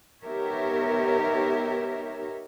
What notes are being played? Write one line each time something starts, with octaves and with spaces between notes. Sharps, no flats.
B3 D#4 G4 A#4 C#5 E5